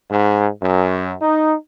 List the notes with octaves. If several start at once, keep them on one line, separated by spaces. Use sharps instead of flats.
G#2
F#2
D#4